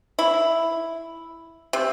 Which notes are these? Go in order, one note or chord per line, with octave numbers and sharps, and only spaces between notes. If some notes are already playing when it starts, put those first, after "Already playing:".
E4
C3